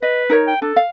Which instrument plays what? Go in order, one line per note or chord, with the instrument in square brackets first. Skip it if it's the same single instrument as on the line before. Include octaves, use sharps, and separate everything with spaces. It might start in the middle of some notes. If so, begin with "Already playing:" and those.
[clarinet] B4 [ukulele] D#5
[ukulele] D#4 A#4 C#5
[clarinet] G5
[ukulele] D4 [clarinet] A4
[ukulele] F5